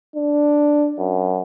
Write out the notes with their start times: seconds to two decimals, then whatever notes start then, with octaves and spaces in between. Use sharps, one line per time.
0.16 D4
0.99 F#2